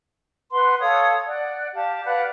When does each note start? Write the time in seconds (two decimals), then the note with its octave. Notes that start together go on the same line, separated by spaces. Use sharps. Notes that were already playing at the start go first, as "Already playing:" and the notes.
0.51 B4 F#5 C6
0.80 A4 C#5 F5 D#6
1.26 D5 F#5
1.75 G4 F5 A5
2.05 B4 D5 F5 F#5